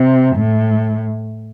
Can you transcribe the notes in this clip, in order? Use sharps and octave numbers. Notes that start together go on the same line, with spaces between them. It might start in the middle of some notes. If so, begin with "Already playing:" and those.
Already playing: C3
A2